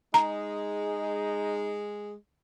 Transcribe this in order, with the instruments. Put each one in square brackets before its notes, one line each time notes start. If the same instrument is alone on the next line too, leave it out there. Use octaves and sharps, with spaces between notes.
[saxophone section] G#3 [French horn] D#4 [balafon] A#5